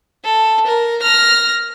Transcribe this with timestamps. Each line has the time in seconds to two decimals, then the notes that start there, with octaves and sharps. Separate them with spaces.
0.24 A4
0.67 A#4
1.02 F6 A#6